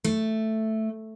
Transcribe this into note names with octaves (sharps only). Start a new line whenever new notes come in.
A3